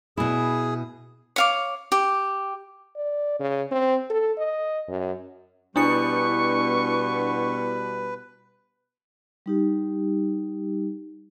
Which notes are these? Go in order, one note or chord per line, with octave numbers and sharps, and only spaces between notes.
B2 E4 G#4
C#5 F5 D6
G4
D5
C#3
C4
A4
D#5
F#2
B2 G3 D4 E4 B4 C#6 C#7
G3 D#4 G4